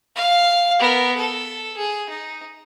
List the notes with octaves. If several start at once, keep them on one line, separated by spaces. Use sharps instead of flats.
F5
B3 A#4
A4
G#4
D#4